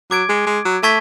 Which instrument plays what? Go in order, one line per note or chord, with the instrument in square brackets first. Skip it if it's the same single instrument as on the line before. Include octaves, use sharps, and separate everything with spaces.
[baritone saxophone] F#3 [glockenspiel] D6 G#6 D7
[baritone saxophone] G#3
G#3
F#3
[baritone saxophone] A3 [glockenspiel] A5 C#6 G#6 B6